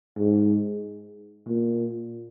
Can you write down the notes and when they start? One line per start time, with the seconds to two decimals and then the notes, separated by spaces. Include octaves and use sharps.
0.18 G#2
1.47 A#2